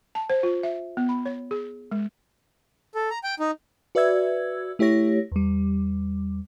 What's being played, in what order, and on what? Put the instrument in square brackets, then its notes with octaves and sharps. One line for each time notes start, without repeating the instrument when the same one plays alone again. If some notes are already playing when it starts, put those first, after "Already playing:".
[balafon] A5
C5
F4
E5
B3
B5
C#5
G#4
G#3
[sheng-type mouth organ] A4
A#5
G5
D#4
[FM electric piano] F#4 B4 D5 E5 E6 G#6
A3 E4 G4 C#5 A#6
E2 G3